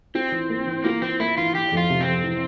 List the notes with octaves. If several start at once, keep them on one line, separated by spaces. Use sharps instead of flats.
C4 F4
E3
A#3
E3
A#3 F4
E3 C4
A#3 E4
E3 F4
E3 G4
F2
F4
C3
C4
F2
E3